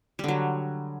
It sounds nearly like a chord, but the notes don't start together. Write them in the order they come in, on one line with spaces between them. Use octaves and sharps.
G3 D3 F#3